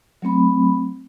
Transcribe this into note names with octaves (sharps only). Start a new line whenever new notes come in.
F#3 A3 C4 B5